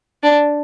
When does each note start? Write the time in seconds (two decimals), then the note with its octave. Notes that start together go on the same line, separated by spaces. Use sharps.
0.23 D4